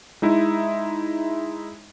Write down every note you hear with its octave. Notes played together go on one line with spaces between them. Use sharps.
G#3 D#4 E4 E5